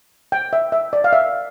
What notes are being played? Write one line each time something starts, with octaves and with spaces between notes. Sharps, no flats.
G5
E5
E5
D5
F5
E5